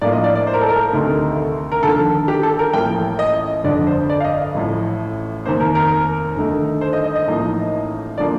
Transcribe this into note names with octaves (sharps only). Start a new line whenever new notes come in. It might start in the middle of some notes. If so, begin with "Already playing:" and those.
A2 F3 A#3 D4 F4 D5
D#5
D5
D5
C5
A#4
A4
A#4
D2 C3 D#3 A3 D#4
A#4
D#2 D3 F3 A4
G4
A4
A#4
A1 A2 F3 A#3 G5
D#5
G1 F2 D3 D5
C5
D5
F5
D#5
A1 A2 F3
F1 D#2 D#3 A#3 C5
A#4
A#4
D#2 D3 A3 D#4
C5
D#5
D#5
D#5
A1 A2 F3 A#3 D#4
D3 F3 A#3 D5